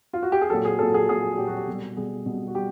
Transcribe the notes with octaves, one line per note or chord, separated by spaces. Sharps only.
F4
F#4
G4
G#4
A#2 F#3 A4
G#4
A#2 F#3 A4
G#4
A#2 F#3 G#4
A#2 F#3 G4
F#4
G4
B2 G3
B2 G3 G#4
B2 G3
F#4
G3 G4